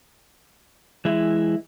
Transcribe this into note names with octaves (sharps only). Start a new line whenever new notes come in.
E3 G#3 E4